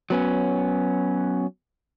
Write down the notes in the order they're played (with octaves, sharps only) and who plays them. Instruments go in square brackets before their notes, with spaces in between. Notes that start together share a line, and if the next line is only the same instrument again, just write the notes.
[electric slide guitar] F#3 B3 C#4